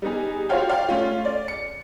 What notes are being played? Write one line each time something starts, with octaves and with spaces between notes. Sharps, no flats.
G3 B3 D#4 G#4
F4 F#4 C5 C#5 F5 G5
D5 F5 G5
A3 C#4 F4
D5
C#7